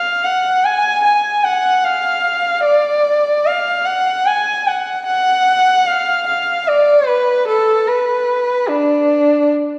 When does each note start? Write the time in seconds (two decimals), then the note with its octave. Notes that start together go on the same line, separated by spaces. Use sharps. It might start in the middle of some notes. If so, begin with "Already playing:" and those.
Already playing: F5
0.24 F#5
0.64 G#5
1.04 G#5
1.44 F#5
1.85 F5
2.65 D5
3.46 F5
3.85 F#5
4.26 G#5
4.67 F#5
5.07 F#5
5.87 F5
6.27 F5
6.68 D5
7.07 B4
7.48 A4
7.88 B4
8.69 D4